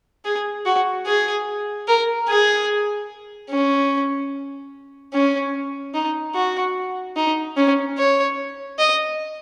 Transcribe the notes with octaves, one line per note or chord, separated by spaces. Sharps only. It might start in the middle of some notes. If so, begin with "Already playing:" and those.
G#4
F#4
G#4
A#4
G#4
C#4
C#4
D#4
F#4
D#4
C#4
C#5
D#5